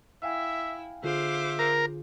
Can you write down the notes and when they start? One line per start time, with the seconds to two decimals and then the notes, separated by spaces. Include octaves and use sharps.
0.23 E4 E5 F5 G5 G#5
1.04 D3 F4 G#4 C5 E5 F5 D6
1.59 A#4